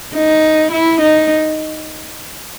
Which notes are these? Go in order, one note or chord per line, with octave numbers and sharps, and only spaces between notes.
D#4
E4
D#4